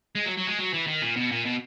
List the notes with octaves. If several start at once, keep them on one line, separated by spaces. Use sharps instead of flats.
G#3
F#3
F#3
G#3
F#3
E3
D#3
A#2
B2
A#2
B2